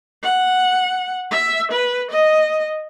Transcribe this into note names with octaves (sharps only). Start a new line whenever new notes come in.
F#5
E5
B4
D#5